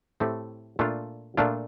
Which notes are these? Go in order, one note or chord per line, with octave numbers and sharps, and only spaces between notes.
A2 A3 C4 G4
A#2 A3 D4 F4
A#2 A3 D4 F4